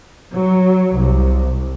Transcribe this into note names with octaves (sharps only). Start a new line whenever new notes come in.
F#3
C2